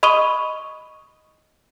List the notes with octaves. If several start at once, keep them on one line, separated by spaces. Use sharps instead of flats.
D#5 B5 C#6 D#6 D#7 G7